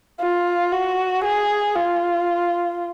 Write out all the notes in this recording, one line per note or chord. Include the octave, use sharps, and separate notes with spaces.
F4
F#4
G#4
F4